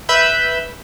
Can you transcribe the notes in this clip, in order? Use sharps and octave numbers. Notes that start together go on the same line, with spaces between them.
B4 E5 B5 E6 G6